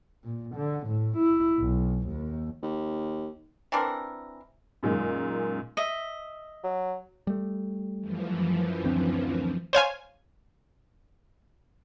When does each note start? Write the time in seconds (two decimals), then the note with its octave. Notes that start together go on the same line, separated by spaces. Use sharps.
0.24 A#2
0.55 D3
0.87 A2
1.17 E4
1.59 B1
2.07 D#2
2.62 D#2
3.72 E3 C4 D4 A#4
4.83 F#2 A#2 D#3 G#3
5.77 D#5 E5
6.64 F#3
7.27 G3 A3
8.00 F#2 E3 F3
8.84 D2 C4 D4
9.73 C5 C#5 F5 G#5